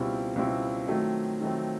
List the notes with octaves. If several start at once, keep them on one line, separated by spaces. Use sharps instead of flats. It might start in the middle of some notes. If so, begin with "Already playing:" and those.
Already playing: C#2 B2 G3 C4 E4
C#2 B2 G3 C4 E4
D#3 F#3 A3 C4
D#3 F#3 A3 C4